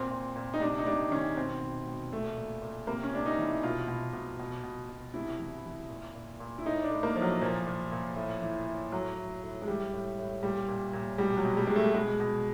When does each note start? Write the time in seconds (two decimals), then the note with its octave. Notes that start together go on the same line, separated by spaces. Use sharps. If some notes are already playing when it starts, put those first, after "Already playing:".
Already playing: A#2 C4
0.11 A#2
0.36 A#2
0.54 D#4
0.60 C3 D4
0.78 D#4
0.86 C3 D4
1.11 D#3 C#4
1.37 B2 C4
1.61 B2
1.87 B2
2.12 A#2 A3
2.37 A#2
2.62 A#2
2.87 C3 A#3
3.03 C#4
3.13 C3 D4
3.26 D#4
3.38 E3
3.63 B2 F4
3.88 B2
4.13 B2
4.39 B2
4.63 B2
4.89 B2
5.14 C3 E4
5.39 E3
5.65 E3
5.90 A#2
6.15 A#2
6.40 A#2
6.58 E4
6.65 A2 D#4
6.84 D4
6.91 A2
7.03 A#3
7.16 A2 F3
7.22 F#3
7.41 A#2 F3
7.67 A#2
7.92 A#2
8.16 A2
8.41 E3
8.67 A2
8.92 A2 F#3
9.17 A2
9.43 A2
9.62 G#3
9.68 E3 G3
9.93 A2
10.19 A2
10.43 A#2 G3
10.68 A#2
10.93 A#2
11.18 B2 G3
11.37 F#3
11.45 B2
11.57 G3
11.67 B2 G#3
11.76 A3
11.94 B2 G#3
12.20 B2